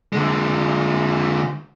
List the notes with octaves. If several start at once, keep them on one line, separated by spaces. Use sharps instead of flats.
D3 G#3